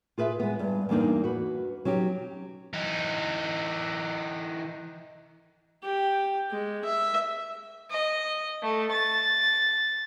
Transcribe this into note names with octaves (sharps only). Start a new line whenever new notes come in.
F4 G#4 B4 E5
G#3 B3
G2
E2 G2 A#3 D4 D#4
F#4 B4
F#3 C#4 D#4 G4
E3 D#4
G4
G#3
E5
D#5
A3
A6